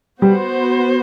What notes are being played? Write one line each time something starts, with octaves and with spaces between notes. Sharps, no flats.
G3 B3 F#4 C5